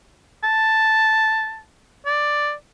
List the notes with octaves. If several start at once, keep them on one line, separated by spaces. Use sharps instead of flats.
A5
D5